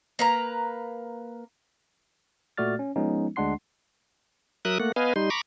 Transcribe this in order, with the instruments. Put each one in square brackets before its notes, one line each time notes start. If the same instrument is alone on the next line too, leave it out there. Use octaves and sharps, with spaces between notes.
[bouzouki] A#3 B4 A#5
[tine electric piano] A#2 A3 F#4 D5 F6 A6
C#4
F3 G#3 B3 C#4 D#4
D2 G#3 D4 F#5 C6 C7
[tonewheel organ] F#3 A#4 E5 D#6 F#6
A3 A#3 F#5
B3 B4 D#5 F5 G#5
G3 D#4 C6
A#5 B5 C#6 D6